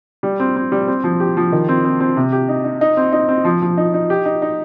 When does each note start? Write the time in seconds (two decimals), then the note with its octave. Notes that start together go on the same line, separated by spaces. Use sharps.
0.23 G3
0.40 C4
0.56 C4
0.72 G3
0.88 C4
1.04 F3
1.20 G4
1.37 F3
1.52 D#3
1.69 C4
1.84 C4
2.00 C4
2.17 C3
2.32 G4
2.49 D#4
2.65 D#4
2.81 D#4
2.97 C4
3.13 D#4
3.28 C4
3.45 F3
3.62 F3
3.77 D#4
3.94 D#4
4.10 G4
4.26 D#4
4.42 D#4